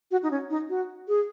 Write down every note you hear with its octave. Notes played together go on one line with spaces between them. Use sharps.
F#4
D#4
C#4
D#4
F#4
G#4